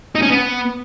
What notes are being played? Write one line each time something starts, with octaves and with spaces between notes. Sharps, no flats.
D#4
C#4
B3